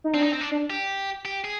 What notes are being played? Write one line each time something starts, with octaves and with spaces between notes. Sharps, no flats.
D#4
C4 D4
D#4
C4
D4
D4
G4
G4
G#4